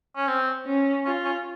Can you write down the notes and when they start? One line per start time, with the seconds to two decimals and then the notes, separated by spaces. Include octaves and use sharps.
0.16 C#4
0.28 C4
0.66 C#4
1.05 C#4 F4
1.25 C#4